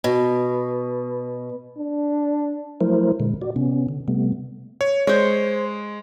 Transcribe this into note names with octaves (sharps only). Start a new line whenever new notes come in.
B2
D4
F3 F#3 A3 E4 A#4 C5
A#2 D3 G#3
F#4 D5
C3 B3 C#4
D3
C3 G3 A3 B3
C#5
G#3 C5 C#5